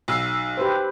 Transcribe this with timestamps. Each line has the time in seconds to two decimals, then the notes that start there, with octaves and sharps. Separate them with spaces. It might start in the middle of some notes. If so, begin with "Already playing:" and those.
0.08 B1 E6 C7
0.57 G4 B4 C5